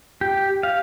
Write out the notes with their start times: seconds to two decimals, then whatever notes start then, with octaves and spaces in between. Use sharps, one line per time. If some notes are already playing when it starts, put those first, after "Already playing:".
0.21 G4
0.63 F5